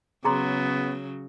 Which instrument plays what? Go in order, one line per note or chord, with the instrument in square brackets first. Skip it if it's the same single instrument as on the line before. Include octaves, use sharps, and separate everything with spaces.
[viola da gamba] C#3 F#3 [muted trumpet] B3 [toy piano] G#4 A#5 C6